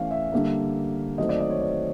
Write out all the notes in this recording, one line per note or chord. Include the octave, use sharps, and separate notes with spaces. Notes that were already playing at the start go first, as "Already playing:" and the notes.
Already playing: E3 A3 C#4 F5
E5
D3 G3 A#3 D4
D#3 F#3 A3 C4 D#5
D5
D#5
C#5
D5